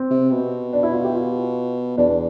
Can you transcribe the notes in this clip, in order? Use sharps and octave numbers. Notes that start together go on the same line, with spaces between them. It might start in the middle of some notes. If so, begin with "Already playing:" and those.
Already playing: C4
C3
B2
D4
E4
F4
G4
F4
E2 D4